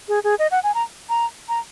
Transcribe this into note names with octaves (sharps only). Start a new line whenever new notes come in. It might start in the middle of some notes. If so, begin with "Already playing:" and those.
G#4
G#4
D#5
F#5
G#5
A#5
A#5
A#5